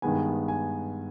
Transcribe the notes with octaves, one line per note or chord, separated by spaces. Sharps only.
G2 D#3 G#3 B3 G#5
G#5